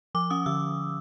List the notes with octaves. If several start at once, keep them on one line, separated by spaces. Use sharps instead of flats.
F3 D6
C#4 D#6
D3 E6